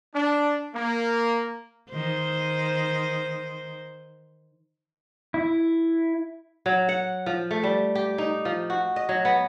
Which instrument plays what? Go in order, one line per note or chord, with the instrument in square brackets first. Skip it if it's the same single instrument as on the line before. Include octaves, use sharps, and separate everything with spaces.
[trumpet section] D4
A#3
[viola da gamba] D#3 C5
[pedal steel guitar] E4
[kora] F#3
F#5
F3
A3
G3
G4
D#4
F3
F#4
D#5
F#3
B3